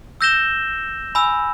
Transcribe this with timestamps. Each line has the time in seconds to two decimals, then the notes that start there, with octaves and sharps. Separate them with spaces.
0.21 E6 G6 A#6 E7 G7
1.15 G#5 B5 E6